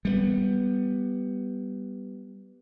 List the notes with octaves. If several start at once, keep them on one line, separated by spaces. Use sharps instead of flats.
G3 A3 B3